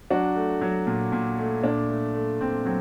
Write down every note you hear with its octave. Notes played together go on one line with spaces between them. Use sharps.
F#3 D4 F#4
A3
F#3
A#2
A#2
A3
A#2 D4
A3
A3
A#2 C4
F#3 C4